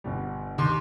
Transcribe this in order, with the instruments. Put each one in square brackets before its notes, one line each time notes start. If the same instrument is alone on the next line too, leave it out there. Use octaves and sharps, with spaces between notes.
[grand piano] G1 B2 G3
[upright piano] D#2 C6